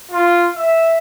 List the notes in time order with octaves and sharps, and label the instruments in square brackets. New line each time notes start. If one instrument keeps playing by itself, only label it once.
[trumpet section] F4
E5